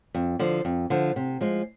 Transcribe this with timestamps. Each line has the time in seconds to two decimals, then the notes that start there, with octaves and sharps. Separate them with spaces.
0.15 F2
0.39 D3 F3
0.65 F2
0.90 D3 F3
1.16 C3
1.41 F3 G#3